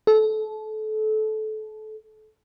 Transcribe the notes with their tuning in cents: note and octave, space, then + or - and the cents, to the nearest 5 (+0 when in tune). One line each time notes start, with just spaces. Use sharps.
A4 -25